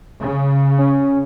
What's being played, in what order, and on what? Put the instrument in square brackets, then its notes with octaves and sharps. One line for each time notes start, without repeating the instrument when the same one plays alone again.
[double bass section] C#3
[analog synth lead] C#4